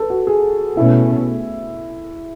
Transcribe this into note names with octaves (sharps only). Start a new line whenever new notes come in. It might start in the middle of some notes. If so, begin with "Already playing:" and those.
Already playing: A4 B4
F#4
G#4
B2 A3 C#4 E4